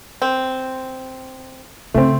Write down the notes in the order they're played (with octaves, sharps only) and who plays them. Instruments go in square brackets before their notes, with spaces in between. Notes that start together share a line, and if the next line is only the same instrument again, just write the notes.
[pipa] C4
[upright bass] C#3 F4 [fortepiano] A3 C4